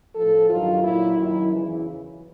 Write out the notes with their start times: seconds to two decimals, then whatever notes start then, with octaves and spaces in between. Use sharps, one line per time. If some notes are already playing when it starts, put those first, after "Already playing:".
0.15 A2 F3 A4
0.48 G2 D#3 F#3 F4
0.82 A#2 F#3 E4
1.16 F#2 D#3 F#3 E4
1.50 E2 C#3 E3